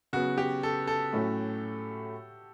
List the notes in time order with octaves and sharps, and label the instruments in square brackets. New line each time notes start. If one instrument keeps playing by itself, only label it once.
[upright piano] C#3 F#3 B3 [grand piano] F#4
[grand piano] G4
A4
A4
[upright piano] A2 F#3 A3 C#4